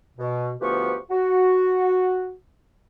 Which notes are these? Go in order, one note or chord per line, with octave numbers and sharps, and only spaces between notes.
B2
D2 F3 B3 G4 B4 C#6
F#4